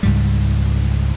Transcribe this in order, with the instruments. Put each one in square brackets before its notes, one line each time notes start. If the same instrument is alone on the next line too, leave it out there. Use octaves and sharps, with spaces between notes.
[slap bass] C#2 G#2 G3